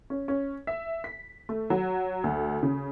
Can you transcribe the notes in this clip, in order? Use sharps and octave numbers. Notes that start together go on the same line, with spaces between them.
C#4
C#4
E5
B6
A3
F#3
D2
C#3